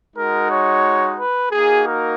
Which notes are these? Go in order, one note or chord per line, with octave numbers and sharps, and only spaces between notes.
G#3 D#4 F#4 A#4
C#5
B4
A#3 D#4 F#4 G#4
A#4